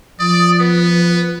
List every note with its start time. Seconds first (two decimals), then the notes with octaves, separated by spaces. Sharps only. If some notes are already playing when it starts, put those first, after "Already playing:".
0.19 F3 D5 D#6
0.60 B3 B4